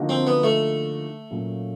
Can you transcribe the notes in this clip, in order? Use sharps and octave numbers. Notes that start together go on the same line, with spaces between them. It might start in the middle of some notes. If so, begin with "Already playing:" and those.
Already playing: D3 F3 A#3 D#4 F#4
C4
B3
A3
A#2 F#3 A#3 C#4 F#4